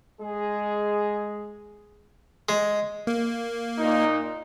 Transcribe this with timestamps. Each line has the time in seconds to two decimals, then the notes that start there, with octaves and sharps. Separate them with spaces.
0.21 G#3 G#4
2.49 G#3
3.07 A#3
3.79 A#2 D#4